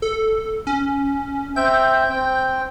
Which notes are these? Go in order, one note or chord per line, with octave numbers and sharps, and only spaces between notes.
A4
C#4
C4 E5 G5 G6
C4 G5